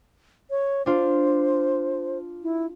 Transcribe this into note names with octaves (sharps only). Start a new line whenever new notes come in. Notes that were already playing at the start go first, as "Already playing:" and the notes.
C#5
D4 F4 C5
E4